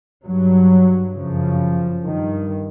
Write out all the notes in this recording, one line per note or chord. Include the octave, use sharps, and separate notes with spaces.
G2 F#3
F#2 C#3 F3
G2 D#3